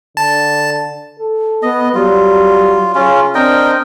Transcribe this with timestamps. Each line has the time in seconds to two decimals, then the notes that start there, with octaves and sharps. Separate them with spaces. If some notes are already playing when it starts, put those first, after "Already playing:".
0.17 D3 A5
1.19 A4
1.63 B3 D#5
1.95 F#3 G3 F4
2.95 C#3 C#4 F4
3.35 C4 D4 A#4 D#5 G5